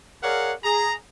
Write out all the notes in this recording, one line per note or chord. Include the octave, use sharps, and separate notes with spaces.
G#4 A#4 C#5 D5 F5 F#5
G#4 A#5